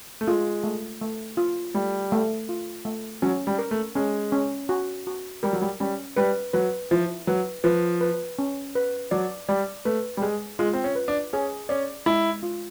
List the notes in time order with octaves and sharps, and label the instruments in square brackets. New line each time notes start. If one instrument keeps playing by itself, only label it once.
[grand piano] A3
[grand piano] G#3 [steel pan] F4
[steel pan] A3
A3
F4
[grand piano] G3 [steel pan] A3
[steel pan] A3
F4
A3
[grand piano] F#3 [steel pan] C#4
[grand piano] G3
[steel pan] A#4
[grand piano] A3
[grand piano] G#3 [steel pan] C#4
[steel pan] C#4
F#4
F#4
[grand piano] G3 [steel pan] A#4
[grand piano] F#3
G3
[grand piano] G3 [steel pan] C#4
[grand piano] G3 [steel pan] B4
[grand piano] F#3 [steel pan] B4
[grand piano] F3 [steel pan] E4
[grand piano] F#3 [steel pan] B4
[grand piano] F3 [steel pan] B4
[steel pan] B4
C#4
B4
[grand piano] F#3 [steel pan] D5
[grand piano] G3 [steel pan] D5
[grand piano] A3 [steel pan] B4
[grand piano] G3
[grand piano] G#3 [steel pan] G#4
[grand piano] G#3 [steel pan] F4
[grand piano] C4
C#4
[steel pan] B4
[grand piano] D4
[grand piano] C#4 [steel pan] G#4
[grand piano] C#4 [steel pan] D5
[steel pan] G#3 [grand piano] E4
[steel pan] F4